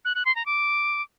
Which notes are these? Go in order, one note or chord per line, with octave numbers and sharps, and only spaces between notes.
F#6
F#6
C6
A#5
D6